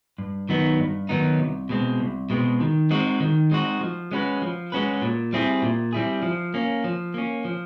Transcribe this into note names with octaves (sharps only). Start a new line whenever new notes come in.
G2
D#3 F#3 B3 D#4
G2
D#3 F#3 B3 D#4
C2
B2 G#3 C4
C2
B2 G#3 C4
D#3
G#3 C4 D#4 F#4
D#3
G#3 C4 D#4 F#4
F3
G#3 C#4 F#4 B4
F3
G#3 C#4 F#4 B4
A#2
G3 C4 E4 G#4
A#2
G3 C4 E4 G#4
F3
A#3 C#4
F3
A#3 C#4
F3